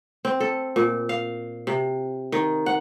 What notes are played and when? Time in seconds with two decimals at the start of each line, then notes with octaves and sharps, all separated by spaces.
0.25 C4
0.40 A4
0.76 A#2
1.09 F5
1.67 C3
2.32 D#3
2.66 F#5